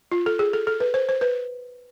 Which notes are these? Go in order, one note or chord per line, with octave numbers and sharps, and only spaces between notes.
F4
A4
G#4
A4
A4
B4
C5
C5
B4